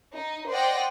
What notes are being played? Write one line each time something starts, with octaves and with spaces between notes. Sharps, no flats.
D#4
C5 D5 D#5 F#5 G5 A#6